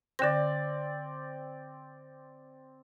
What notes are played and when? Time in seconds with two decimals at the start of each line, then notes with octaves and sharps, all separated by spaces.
0.19 D3 C4 D5 A#6